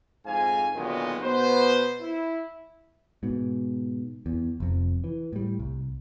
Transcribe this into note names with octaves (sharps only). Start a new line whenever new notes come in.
F2 G#2 F5 G#5
A#2 D3 D#3 F#3 G#3 B3
B2 B3 B4 C5
E4
G#2 B2
E2
F1 F2
E3
A2 G3
C2